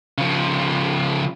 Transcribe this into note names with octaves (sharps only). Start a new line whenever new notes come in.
C#3 F3